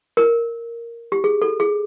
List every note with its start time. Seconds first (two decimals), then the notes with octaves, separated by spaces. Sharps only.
0.17 A#4
1.12 G4
1.24 G#4
1.42 A4
1.60 G#4